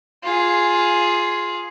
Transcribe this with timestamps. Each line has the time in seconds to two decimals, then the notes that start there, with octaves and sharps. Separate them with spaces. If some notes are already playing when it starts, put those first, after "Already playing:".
0.24 F4 G#4